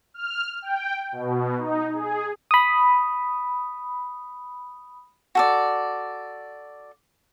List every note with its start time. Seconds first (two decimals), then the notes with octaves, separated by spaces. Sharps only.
0.14 F6
0.62 G5
1.12 B2
1.58 D#4
1.92 G#4
2.51 B5 D#6
5.35 F#4 A4 D5